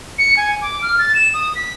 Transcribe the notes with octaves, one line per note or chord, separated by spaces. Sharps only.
C#7
G#5
D6
F6
A6
E7
D#6
B6